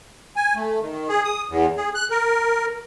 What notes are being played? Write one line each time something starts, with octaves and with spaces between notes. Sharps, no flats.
G#5
A3
D#3
G#4
D#6
E2
G#4
F#6
A#4